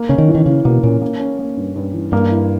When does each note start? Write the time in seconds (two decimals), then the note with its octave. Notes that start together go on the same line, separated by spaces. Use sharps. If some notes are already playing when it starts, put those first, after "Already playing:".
Already playing: A#3
0.09 C#3 C#4
0.18 D#3
0.28 E3
0.35 D#3
0.46 C#3 E3
0.65 B2 A#3
0.83 A#2 C#4
1.02 A#3
1.20 C#4
1.39 A#3
1.57 G2
1.76 G2
1.94 E3
2.12 G2 A#3
2.31 E4